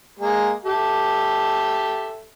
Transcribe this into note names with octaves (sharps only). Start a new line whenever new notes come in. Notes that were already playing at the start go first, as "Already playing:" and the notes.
G#3 A#3
G4 A4 E5